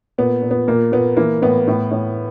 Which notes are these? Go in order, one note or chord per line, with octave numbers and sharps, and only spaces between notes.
A#2 B3
A#2
B3
A#2 A#3
A#2 B3
E3 A#3
A2 B3
A2
A2